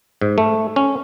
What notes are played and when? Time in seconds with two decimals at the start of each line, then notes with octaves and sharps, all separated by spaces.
0.21 G#2
0.38 A3
0.76 C#4